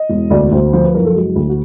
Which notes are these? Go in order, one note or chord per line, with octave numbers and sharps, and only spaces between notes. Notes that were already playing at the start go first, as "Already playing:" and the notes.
Already playing: D#5
E1
D2 D5
D2 C5
F3 C5
B4
F#1 A#4
A4
G#3 F#4
D2
F#4